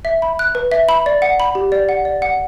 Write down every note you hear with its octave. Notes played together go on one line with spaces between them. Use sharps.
E5
B5
F#6
B4
E5
B5
D5
F#5
B5
G4
D5
F#5
D5
F#5